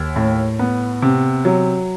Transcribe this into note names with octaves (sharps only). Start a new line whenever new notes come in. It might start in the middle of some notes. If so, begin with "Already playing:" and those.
Already playing: D#2
A2
B3
C3
F#3